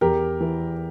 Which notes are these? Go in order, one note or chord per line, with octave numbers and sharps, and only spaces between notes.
E2 G4 A#4
E3